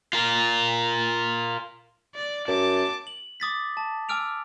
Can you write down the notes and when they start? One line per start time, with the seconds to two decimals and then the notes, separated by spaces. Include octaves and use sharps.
0.13 F4 A#4
2.15 D5
2.48 F#2 A5 D6
3.07 F#7
3.40 D6 D#6 A6 B6
3.77 A5
4.09 G#5 D6 E6 F6 D7 F7